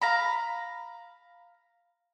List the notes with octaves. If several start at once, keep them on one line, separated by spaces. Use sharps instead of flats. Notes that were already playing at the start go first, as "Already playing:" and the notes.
F5 A#5 B5